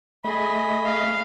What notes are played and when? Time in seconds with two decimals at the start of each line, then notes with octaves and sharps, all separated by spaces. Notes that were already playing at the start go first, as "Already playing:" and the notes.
0.24 A3 G#4 D#5 B5
0.85 F5